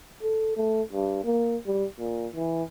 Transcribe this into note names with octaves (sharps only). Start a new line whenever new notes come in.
A4
A3
G2
A#3
G3
A#2
E3